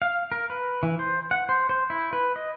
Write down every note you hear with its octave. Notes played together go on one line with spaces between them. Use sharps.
F5
A#4
B4
E3
C5
F#5
C5
C5
E4
B4
D#5